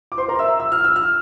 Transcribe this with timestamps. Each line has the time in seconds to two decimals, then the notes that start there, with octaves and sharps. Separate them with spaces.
0.12 D6
0.18 C5 C6
0.28 A#4 A#5
0.39 E5 E6
0.60 E6
0.72 F6
0.84 E6
0.96 F6